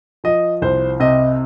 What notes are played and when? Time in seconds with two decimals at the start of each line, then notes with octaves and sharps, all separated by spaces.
0.24 F3 D#5
0.62 C2 C5
1.00 C3 D#5